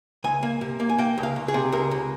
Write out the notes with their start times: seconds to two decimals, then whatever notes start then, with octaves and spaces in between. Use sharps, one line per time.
0.24 C#2 G#5
0.43 A#3
0.61 C3
0.80 A#3
0.89 G#5
0.98 A#3 G5
1.18 C#2
1.23 F5
1.36 C#2
1.48 G#4
1.54 C3
1.72 C#2 A#4
1.91 C#2